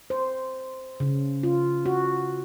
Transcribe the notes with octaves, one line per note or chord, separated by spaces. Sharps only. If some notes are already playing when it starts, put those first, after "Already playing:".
C5
C#3
F4
F#4